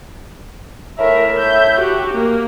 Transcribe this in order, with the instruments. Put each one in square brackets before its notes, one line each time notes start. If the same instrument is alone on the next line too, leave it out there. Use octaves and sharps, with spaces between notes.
[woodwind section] A2 E5 [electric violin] A#4
[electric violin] G6
F#4 G4
A#3